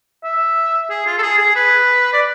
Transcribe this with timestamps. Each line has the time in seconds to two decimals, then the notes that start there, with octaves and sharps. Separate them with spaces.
0.24 E5
0.90 G#4
1.07 F4
1.18 A4
1.22 G#4
1.38 G#4
1.56 B4
2.13 D5